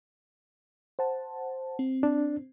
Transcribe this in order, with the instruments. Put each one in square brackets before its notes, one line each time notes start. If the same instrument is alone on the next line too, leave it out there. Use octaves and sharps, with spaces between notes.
[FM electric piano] C5 F#5 A5
C4
[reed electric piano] D4